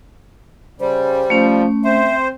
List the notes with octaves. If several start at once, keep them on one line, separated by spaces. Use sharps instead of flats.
C#3 G3 C5
F3 A3 C#4
C4 C5 E5